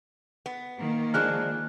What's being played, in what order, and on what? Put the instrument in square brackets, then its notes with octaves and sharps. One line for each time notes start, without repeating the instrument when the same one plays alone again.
[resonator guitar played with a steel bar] B3
[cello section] D#3 A#3
[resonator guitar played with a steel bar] F3 G#3 D4 [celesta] F6 F#6